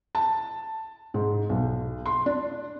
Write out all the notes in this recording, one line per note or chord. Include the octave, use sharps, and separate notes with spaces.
A5
G#2
B1
C6
D4